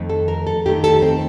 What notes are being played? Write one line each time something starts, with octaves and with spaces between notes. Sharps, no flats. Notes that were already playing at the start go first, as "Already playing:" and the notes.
Already playing: F2 D#3 A3
A4
A#4
A4
F2 D#3 A3 G4
A4
C4